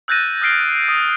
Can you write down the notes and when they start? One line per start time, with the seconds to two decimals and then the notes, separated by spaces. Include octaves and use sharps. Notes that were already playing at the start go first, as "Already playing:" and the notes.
0.08 E6 F#6 G6 A6 A#6 D#7
0.42 D#6 F6 C7 D7 G7
0.88 D#6